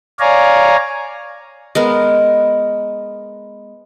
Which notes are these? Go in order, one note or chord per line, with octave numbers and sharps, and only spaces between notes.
C#5 D5 F5 G#5 A#5
G#3 B3 A#4